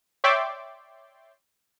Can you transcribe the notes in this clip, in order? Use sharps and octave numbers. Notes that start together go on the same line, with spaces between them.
C#5 D5 E5 G5 C6 D6